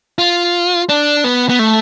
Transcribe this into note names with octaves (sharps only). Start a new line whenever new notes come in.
F4
D4
B3
B3
A3